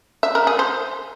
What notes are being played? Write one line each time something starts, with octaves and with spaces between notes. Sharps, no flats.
E5
A#4
G#4
C5